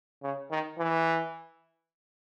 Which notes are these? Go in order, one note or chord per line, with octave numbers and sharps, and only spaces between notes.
C#3
D#3
E3